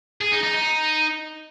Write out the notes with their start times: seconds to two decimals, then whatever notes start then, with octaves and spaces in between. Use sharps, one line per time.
0.21 G#4
0.32 D#4
0.43 D#4
0.55 D#4